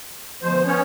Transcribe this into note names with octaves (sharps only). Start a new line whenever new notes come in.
D2 B2 F3 C5
B3 C#4 C#5